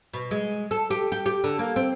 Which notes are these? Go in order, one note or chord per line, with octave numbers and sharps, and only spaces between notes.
B2
G#3
A4
G4
G4
G4
D3
A#3
C4